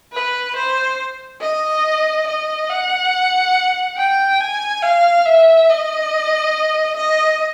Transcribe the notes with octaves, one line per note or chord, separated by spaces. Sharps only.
B4
C5
D#5
D#5
F#5
G5
G#5
F5
E5
D#5
D#5